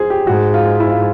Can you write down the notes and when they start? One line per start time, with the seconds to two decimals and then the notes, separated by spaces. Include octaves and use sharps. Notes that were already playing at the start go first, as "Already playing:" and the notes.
Already playing: G#4 C5
0.10 G4
0.27 G#2 F#4
0.54 F4
0.80 E4
0.90 F4